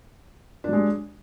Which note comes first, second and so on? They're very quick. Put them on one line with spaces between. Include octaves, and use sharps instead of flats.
D4 F#3 G#3